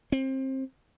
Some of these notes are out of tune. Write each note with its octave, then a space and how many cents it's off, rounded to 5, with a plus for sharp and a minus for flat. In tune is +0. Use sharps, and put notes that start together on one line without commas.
C4 +25